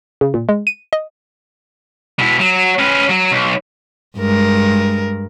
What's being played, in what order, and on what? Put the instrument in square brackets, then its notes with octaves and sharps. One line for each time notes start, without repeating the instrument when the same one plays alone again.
[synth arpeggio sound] C#3
A#2
G#3
D#7
D#5
[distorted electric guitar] B2 E4
F#3
C#4 B4
F#3
B1
[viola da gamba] G2 G#3 A#4